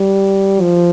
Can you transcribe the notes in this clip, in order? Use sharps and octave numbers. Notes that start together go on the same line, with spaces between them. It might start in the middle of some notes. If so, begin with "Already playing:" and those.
Already playing: G3
F3